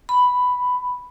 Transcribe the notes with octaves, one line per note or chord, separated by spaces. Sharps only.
B5